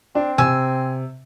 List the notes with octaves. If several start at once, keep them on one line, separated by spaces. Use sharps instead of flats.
C4 D4
C3 G#5 E6